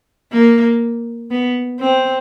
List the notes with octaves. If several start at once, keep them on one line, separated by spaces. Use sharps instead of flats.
A#3
B3
C4